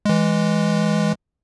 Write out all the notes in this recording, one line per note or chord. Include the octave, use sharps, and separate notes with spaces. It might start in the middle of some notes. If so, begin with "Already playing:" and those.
E3 G#3